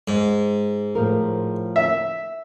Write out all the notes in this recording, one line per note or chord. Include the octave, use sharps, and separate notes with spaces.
G#2
A2 F3 A#4
E5